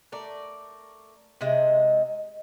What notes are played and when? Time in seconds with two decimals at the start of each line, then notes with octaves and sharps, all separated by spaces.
0.12 A3 A#4 D5
1.41 C3 G#3 D#5 E5